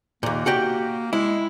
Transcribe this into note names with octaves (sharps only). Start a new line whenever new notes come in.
D#2 A#2 A#3
F#4 G4 G5
G#3 E4